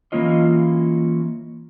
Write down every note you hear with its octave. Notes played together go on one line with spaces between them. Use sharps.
E3 F#3 A#3 C#4 F4 D#5